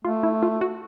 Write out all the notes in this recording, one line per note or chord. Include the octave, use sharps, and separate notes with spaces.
A3 F4
E4
F4
F#4